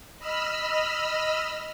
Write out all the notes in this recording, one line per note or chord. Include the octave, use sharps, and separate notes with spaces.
D#5 B5 E6 F6